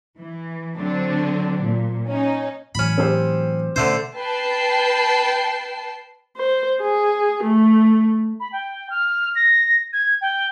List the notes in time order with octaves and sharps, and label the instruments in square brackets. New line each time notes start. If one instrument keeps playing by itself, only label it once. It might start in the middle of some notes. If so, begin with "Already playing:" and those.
[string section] E3
D3 F#3 C4 D4
A#2
C#4 D#4
[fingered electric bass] A2 E3 F#3 [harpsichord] C#4 B5
[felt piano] C4 G4 C5
[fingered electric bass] B2 C#4 [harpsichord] D3 A3 C5
[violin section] B4 G5 A5 C7
[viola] C5
G#4
A3
[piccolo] B5
G5
F6
A#6
G#6
G5